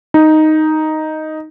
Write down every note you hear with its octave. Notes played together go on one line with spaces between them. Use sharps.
D#4